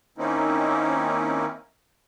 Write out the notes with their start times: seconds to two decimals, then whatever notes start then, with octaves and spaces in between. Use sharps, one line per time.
0.18 D#3 A#3 C4 C#4 D#4 E4